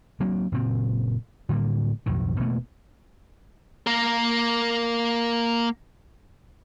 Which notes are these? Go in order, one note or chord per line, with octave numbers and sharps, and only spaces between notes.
F#3 A#3 C4 D4
F#1 A#2 C4
A2 D3 G3 A#3
B1 F2 A2 D#3
E1 B2 A3 A#3
A#3 A#4